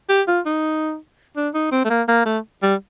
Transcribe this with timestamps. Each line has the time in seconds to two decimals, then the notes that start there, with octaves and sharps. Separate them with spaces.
0.09 G4
0.28 F4
0.46 D#4
1.36 D4
1.54 D#4
1.72 C4
1.85 A3
1.90 A#3
2.08 A#3
2.26 A3
2.62 G3